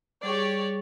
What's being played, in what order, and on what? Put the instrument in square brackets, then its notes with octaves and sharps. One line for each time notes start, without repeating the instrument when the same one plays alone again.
[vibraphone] G3 G#4 [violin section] G4 C#5 D5